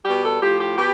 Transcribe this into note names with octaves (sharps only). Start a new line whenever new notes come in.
B2 G3 G4
A4
A2 F3 G4
G4
B2 G4